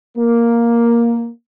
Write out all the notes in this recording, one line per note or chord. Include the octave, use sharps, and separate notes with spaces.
A#3